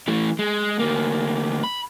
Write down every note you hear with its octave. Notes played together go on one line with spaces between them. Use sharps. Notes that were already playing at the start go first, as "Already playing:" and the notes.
E3 A3
G#3
D2 A#3
B5